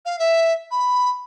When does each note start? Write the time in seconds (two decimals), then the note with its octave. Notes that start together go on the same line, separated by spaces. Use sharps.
0.05 F5
0.19 E5
0.71 B5